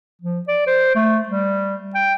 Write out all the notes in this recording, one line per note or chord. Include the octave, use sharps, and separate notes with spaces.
F3
D5
C5
A3
G3
G5